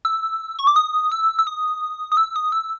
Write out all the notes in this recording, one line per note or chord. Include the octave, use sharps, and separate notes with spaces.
E6
C#6
D6
D#6
E6
E6
D#6
D#6
E6
D#6
E6